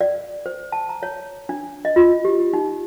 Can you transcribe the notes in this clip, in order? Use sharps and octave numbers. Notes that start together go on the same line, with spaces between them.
D5
C5
A5
A#5
C#5
D4
D#5
F4
G4
D#4